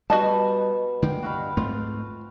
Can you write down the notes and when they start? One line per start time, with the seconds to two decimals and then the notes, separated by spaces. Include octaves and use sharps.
0.10 B2 G3 F#4 D#5 A5
1.02 D3 G#3 A#3 G5
1.23 G2 F#4 F5 B5
1.57 G#2 A3 C4 F4